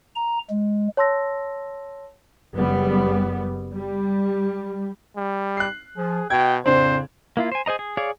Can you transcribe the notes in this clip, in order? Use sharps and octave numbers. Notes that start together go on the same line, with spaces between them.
A#5
G#3
C#5 A5 C6 E6 A#6
F#1 G3 B3
G3
G3
F#6 C7
F3 G#4
B2 F#4 D#5 G5 G#6
F2 A2 C#3 C4 D4 C5
A#3 E4 F4
C5 G#5
G#4 C5 D#5 A#5
G#4
G#4 C#5 D5 F5